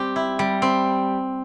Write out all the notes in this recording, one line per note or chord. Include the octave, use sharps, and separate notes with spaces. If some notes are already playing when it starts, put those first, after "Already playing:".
Already playing: G3 C4 G4
E4
G3
C4